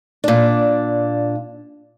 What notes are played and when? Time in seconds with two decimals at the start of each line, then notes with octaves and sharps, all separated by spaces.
0.24 A#2 D4